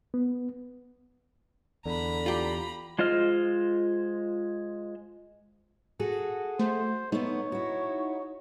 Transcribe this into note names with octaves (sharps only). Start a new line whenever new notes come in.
B3
E2 D3 A#5 B5
F4 G4
G#3 F4 C5 D#5 F6
F#4 G#4 A4
A3 C5
A3 B3 D#4 C#5
E4 F#4